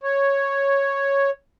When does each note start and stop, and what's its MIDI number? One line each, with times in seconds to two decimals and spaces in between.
0.03 1.30 73